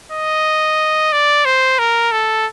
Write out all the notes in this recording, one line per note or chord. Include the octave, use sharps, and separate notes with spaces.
D#5
D5
C5
A#4
A4